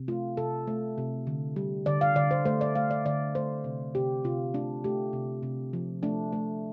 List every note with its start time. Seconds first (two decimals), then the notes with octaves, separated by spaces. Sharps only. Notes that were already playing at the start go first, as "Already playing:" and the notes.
Already playing: C3
0.08 A3 F4
0.37 C3 A4
0.67 A3
0.98 C3
1.27 D3
1.56 G3
1.86 D3 D5
2.01 F5
2.16 D3 D5
2.31 C5
2.45 A3 C5
2.61 D5
2.75 A3 F5
2.91 D5
3.06 D3 D5
3.35 A3 C5
3.64 C3
3.95 C3 G4
4.24 C3 F4
4.54 A3 D4
4.84 A3 G4
5.13 C3
5.43 C3
5.73 F3
6.03 A3 D4
6.33 A3